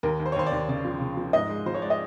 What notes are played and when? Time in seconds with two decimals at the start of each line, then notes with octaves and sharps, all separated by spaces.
0.03 D#2 A#4
0.20 D#2
0.26 C5
0.32 C#5
0.36 D#2 C5
0.46 D5
0.52 D#2
0.68 C#3 D5
0.85 F3
1.01 C#3
1.17 F3
1.33 G#2 D#5
1.49 G#3
1.66 F3 C5
1.74 C#5
1.82 G#3 D5
1.90 D#5